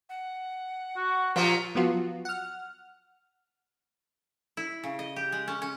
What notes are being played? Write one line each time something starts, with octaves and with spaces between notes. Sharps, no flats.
F#5
F#4
A#2 F3 A#3 F4 G4
F3 F#3 B3 F4 F#4
F#5 F6
E4
C#3
D#5
G4
G#3
C#4
C#4